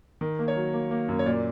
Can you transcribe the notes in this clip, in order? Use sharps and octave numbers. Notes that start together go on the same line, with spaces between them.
D#3
A#3
C#5
F#3
A#3
A#3
F#2
C#5
A#2 D5